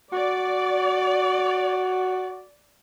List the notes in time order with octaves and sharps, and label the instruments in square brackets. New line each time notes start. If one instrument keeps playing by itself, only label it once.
[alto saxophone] F#4 [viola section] D5